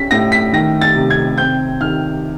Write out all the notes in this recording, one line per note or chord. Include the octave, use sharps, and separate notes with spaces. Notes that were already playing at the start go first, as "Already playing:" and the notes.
Already playing: C#4 B6
A2 A#6
B6
D#3 A#6
A6
C3
G#6
C4 G6
D#3 F6